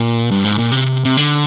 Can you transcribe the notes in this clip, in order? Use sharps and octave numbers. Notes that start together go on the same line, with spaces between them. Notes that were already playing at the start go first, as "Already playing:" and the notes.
Already playing: A#2
G2
G#2
A#2
C3
C3
D3